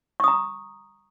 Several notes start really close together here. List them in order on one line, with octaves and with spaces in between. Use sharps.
C#6 D#6 A#5